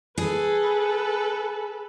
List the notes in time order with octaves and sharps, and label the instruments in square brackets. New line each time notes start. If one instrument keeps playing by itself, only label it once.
[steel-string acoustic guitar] G#4 [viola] A4 B4